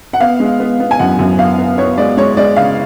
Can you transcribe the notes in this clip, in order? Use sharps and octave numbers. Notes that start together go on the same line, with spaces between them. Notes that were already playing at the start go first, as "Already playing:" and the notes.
F#5
B3 F5
G#3
B3
B3
G#5
F#2 F#5
F#2
B3 F5
B3
B3 C#5
G#3 D5
G#3 C#5
G#3 D5
C#3 F5